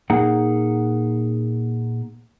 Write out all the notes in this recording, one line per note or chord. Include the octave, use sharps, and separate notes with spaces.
A#2 A#3 D#4 G#4 F#5 A#5